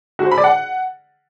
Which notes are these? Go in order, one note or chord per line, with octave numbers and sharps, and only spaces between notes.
F#4
C5
B5
D5
F#5